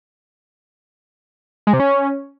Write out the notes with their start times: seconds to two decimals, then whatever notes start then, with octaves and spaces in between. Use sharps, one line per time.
1.67 G#3
1.73 C3
1.80 C#4